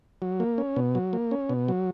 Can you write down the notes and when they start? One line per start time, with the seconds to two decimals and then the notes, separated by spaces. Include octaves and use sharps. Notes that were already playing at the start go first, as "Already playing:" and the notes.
0.22 F#3
0.40 A#3
0.58 C#4
0.76 B2
0.95 F#3
1.13 A#3
1.31 C#4
1.49 B2
1.68 F#3